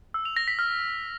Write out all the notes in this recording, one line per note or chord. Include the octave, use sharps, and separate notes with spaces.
E6
F7
A#6
B6
F6